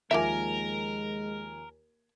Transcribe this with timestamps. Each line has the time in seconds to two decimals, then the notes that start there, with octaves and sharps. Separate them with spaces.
0.11 D#2 F3 G#3 A#3 G4 A#4 E5 G#5